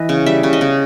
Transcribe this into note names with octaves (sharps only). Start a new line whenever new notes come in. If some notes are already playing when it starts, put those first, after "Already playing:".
Already playing: E3 D#5
C#3
G3 E5
C#3
D#5
C#3